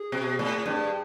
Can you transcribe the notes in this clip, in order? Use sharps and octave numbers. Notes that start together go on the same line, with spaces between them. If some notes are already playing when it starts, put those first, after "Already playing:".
Already playing: G#4
B2
A2
G2